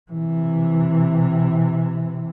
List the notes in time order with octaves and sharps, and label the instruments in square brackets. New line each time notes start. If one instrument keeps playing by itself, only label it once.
[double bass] C3 E3